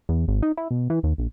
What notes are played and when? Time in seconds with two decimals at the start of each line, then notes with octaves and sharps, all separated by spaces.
0.09 E2
0.28 G#1
0.42 D#4
0.57 E4
0.71 B2
0.90 E3
1.03 D#2
1.18 A#1